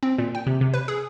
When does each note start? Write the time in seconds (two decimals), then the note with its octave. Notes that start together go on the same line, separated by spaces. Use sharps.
0.03 C4
0.18 A#2
0.35 G5
0.47 C3
0.61 C3
0.74 B4
0.88 G#4